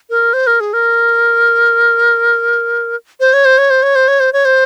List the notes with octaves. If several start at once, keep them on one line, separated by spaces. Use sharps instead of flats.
A#4
C5
A#4
G#4
A#4
C5
C#5
C5
C#5
C5
C#5
C5
C#5
C5
C#5
C5